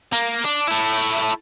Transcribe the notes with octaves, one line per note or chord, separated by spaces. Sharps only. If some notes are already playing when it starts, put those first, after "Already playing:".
A#3
D4
A3 E4